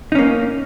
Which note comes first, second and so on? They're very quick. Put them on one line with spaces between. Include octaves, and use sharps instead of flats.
D#4 C#4 A#3